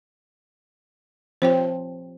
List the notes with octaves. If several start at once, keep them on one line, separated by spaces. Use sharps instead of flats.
F3 C4 C5 C#5 G5